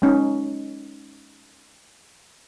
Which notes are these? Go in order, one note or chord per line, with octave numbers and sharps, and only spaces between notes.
G#3 C#4 D#4